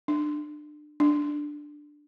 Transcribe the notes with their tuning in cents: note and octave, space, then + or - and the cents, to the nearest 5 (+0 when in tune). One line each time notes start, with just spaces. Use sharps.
D4 +30
D4 +5